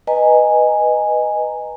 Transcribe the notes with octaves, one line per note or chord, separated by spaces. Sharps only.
B4 D#5 G#5 A#5